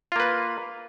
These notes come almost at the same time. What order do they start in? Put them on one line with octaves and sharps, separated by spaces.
F4 A#3 B4